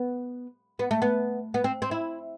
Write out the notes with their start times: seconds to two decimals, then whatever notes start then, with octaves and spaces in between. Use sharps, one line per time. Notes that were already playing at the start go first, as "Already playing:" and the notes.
Already playing: B3
0.79 B3
0.91 A3
1.02 B3
1.54 B3
1.64 C4
1.82 C4
1.91 E4